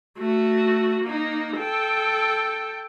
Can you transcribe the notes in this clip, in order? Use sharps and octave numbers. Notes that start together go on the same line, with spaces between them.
A3 F#4
A#3 D#4
A4 G5